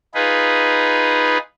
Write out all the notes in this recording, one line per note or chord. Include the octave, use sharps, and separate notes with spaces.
D#4 F4 G#4 B4